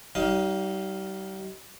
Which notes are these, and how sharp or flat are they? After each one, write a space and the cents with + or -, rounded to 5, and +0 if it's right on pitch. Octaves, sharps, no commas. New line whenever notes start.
G3 -35 D#4 +25 F5 +0